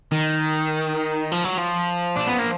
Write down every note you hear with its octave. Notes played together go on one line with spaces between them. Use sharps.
D#3
F3
F#3
F3
D4
B3
A#3